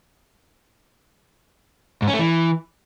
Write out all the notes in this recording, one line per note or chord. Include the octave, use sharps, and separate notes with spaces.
G#2
C#4
A3
E3